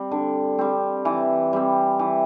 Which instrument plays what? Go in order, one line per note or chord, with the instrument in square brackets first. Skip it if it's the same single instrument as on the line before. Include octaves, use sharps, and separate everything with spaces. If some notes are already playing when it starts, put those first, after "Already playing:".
Already playing: [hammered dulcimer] G3 C4
D3
G3 C4
E3
G3 C4
E3